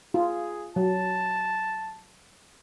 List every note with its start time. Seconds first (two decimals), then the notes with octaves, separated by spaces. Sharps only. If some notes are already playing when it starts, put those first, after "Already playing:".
0.14 F4 G#4
0.76 F#3 A5